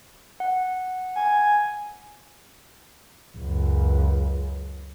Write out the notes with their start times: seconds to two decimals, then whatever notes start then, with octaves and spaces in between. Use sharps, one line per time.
0.40 F#5
1.16 G#5
3.37 C#2 F#2